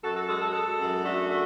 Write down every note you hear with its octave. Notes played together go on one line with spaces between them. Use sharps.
F#2 F#4 A4
F#4 A4
G#3 F#4 A4
F#4 A4
G#3 F#4 A4
F#2
A3 D4 F#4
A3